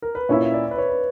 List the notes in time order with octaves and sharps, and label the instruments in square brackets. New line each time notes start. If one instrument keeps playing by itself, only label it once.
[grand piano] A#4
B4
[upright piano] A#2 A#3 C#4 E4 [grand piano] C#5
[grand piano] E5
D5
B4
C#5
B4